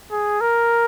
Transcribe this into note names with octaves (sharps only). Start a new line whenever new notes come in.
G#4
A#4